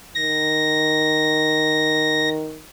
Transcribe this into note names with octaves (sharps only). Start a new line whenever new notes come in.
D#3 A#6